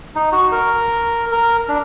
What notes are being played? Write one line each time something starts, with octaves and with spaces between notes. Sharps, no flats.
D#4
F#4
A#4
A#4
D4